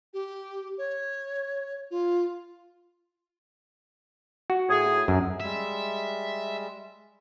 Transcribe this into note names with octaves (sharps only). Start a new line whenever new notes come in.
G4
C#5
F4
F#4
A2 G#4
F#2
G3 G#3 E5